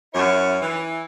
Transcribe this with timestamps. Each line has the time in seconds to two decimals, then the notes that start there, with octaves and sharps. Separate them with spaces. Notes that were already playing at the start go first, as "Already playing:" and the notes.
0.14 F#2 E4 C#5
0.61 E3